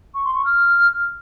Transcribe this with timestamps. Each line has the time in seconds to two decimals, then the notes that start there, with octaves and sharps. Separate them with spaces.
0.14 C#6
0.24 C6
0.35 C#6
0.45 F6